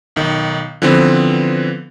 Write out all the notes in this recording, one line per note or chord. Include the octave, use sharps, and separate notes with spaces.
B1 D#3
D3 E3 F3 B3 C4